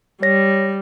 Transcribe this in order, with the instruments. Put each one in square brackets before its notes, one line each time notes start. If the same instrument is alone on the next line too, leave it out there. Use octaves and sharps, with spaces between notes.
[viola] G3 [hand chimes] C#5 A#6